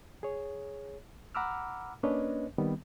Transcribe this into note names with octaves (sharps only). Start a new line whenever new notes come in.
G#4 C#5
F#5 A#5 B5 D6 E6 F6
A#3 C#4 D4 B4 C#5 D#5
D#3 G3 B3 C4